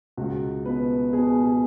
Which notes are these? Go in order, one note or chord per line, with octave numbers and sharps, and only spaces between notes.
C#2 F#4
B2 B4
B2 G#4
G#4